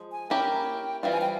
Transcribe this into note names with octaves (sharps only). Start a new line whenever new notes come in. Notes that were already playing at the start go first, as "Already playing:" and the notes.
Already playing: F3 G#3
G#5
A#3 C#4 E4 G4 A#4 G5
E3 G3 C4 F4 F5
G#5
G5